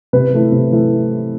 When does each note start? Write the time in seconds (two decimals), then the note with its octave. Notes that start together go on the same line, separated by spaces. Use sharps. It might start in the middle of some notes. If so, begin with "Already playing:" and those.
0.13 C3 B4
0.33 E3 A3 E4
0.52 C3
0.71 E3 A3 E4